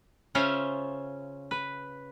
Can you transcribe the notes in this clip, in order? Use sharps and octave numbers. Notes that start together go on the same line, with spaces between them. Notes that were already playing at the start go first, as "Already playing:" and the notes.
C#3 C#4 F4 C5 C#5 E5
B4